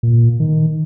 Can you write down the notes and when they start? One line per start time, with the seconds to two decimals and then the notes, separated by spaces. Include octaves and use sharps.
0.03 A#2
0.40 D#3